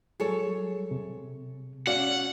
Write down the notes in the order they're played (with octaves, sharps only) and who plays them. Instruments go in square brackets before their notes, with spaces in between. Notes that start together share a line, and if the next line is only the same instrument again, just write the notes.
[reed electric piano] F#3 G3 [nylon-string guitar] G#4 A4 C#5
[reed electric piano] C3
[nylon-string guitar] C#4 [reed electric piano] F#4 D5 F5 [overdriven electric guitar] F#5